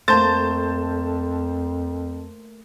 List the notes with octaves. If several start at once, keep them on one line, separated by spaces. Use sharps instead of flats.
F2 A3 A#3 C5 A5 G6 A6